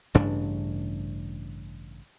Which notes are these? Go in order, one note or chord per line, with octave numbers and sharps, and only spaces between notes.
A1 G2 C#3 D4